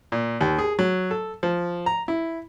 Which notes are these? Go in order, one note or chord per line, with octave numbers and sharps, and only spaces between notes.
A#2
D#2
G#4
F#3
A4
F3
A#5
E4